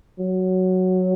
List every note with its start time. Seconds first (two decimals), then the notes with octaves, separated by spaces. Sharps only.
0.19 F#3